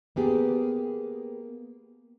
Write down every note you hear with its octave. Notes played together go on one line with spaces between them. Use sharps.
A#3 B3 G4 G#4